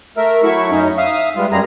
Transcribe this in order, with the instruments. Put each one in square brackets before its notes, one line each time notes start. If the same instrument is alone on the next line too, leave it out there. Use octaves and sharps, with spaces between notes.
[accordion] A3 A#4 E5
F#3 A3 E4 E5 C#6
F#2 C#4 D#4
E5 F5 D#6
G3 G#3 B3 F4
F#2 G3 G#3 G#4 A#5